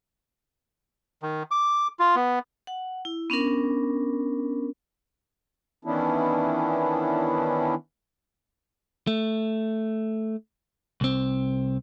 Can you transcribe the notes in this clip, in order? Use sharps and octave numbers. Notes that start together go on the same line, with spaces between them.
D#3
D6
F4
B3
F#5
E4
B3 C#4 D4 A#4
D#3 E3 B3 C#4 D4 E4
A3
C2 C4